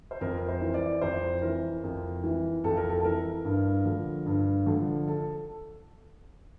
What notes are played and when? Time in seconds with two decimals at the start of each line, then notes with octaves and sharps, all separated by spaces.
0.11 C5
0.21 F2 A#4
0.38 A#4
0.48 C5
0.61 E3
0.74 D5
1.01 F2 C5
1.42 E3 A#4
1.84 F2
2.24 E3
2.64 F2 A4
2.77 A#4
2.89 A4
3.00 A4
3.05 E3 A#4
3.45 G2
3.85 D3 F3
4.26 G2
4.66 D3 F3
5.07 A4